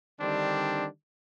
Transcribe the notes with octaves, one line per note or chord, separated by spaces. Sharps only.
D3 D#3 G3 C4 D4